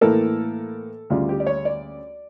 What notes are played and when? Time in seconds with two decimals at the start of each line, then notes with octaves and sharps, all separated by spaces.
0.01 A2 E3 A#3 A4
1.10 D2 C#3 G3 F4
1.29 G4
1.40 D5
1.47 C#5
1.65 D5